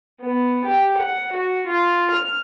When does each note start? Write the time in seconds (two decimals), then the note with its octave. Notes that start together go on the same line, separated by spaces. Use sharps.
0.22 B3
0.64 G4
0.98 F#5
1.32 F#4
1.67 F4
2.10 F6